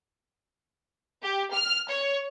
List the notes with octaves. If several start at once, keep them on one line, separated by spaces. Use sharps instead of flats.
G4
F6
C#5